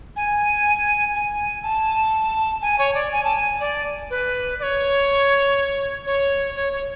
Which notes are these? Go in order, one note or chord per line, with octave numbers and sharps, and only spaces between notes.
G#5
G#5
A5
G#5
C#5
D5
G#5
A5
G#5
D5
B4
D5
C#5
C#5
C#5
C#5